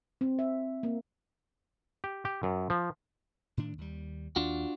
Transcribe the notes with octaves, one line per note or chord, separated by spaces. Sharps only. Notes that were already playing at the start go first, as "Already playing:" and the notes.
C4
E5
A#3
G4
G4
F#2
F3
A2 D#3 D4
D#2 G3
D#2 D4 F4 F#4